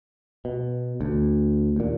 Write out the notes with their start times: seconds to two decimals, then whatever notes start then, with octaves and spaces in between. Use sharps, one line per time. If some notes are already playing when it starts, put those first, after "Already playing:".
0.45 B2
1.01 D2
1.76 D#2 A#2